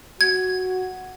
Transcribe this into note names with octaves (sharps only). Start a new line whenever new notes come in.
F#4 G#6